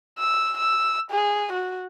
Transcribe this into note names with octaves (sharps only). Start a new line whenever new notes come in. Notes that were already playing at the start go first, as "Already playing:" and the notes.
E6
E6
G#4
F#4